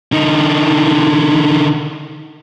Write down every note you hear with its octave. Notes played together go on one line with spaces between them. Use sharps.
D3 D#4